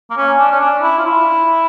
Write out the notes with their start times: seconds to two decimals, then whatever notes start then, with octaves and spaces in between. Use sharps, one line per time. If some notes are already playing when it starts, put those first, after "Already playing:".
0.11 A#3
0.17 C#4
0.38 D4
0.52 C#4
0.60 D4
0.82 E4
0.98 F4
1.05 E4